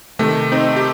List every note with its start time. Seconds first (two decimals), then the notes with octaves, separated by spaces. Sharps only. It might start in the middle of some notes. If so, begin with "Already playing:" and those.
0.19 C3 D#3 A3
0.52 C4 D#4
0.76 G4